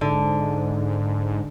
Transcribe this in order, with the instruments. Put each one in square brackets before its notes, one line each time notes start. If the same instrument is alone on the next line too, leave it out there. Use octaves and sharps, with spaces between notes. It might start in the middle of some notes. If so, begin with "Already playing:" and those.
[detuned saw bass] G#2 [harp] D3